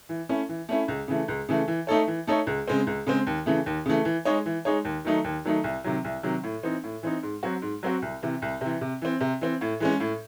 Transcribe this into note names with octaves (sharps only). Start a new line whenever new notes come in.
E3
A3 C#4 E4
E3
A3 C#4 E4
C#2
C#3 E3 A3
C#2
C#3 E3 A3
E3
A3 D#4 A4 C#5
E3
A3 D#4 A4 C#5
C#2
C#3 G#3 C4
C#2
C#3 G#3 C4
D#2
C#3 E3 A3
D#2
C#3 E3 A3
E3
G#3 D#4 G#4 C#5
E3
G#3 D#4 G#4 C#5
D#2
D#3 F#3 A3 D#4
D#2
D#3 F#3 A3 D#4
C2
C3 D#3 F#3
C2
C3 D#3 F#3
A2
E3 C4 D#4
A2
E3 C4 D#4
G#2
F#3 C4 F#4
G#2
F#3 C4 F#4
C2
C3 E3
C2
C3 E3
C3
E3 C4
C3
E3 C4
A2
E3 G#3 C#4
A2